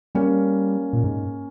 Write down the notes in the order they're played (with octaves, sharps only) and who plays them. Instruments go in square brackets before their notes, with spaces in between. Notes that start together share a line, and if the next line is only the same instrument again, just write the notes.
[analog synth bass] G3 [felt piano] A#3 C#4
[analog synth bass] A#2
G#2